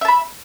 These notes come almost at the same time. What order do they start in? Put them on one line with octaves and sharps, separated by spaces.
E5 A5 B5